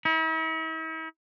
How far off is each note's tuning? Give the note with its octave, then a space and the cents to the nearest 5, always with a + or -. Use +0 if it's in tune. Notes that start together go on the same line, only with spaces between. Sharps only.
E4 -45